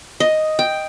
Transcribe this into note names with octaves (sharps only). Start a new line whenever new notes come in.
D#5
G5